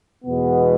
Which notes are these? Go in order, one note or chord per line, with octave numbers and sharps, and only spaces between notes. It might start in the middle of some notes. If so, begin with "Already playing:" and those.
E2 B2 G#3 B3